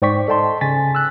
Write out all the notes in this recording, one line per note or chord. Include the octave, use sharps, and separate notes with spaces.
G#2 C5 D5 G5 C#6 B6
A4 D#5 G5 A5 C6
C#3 G#5 A6 B6
E6 F#6